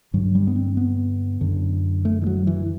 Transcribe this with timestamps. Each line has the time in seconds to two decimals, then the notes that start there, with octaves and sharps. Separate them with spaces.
0.13 G2 D3 F#3
0.35 G3
0.47 B3
0.56 C4
0.77 B3
1.41 F#2 D3
2.05 A3
2.22 E3
2.27 F#3
2.47 E3